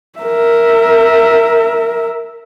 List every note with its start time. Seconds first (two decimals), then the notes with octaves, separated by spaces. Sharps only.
0.19 A#4 E5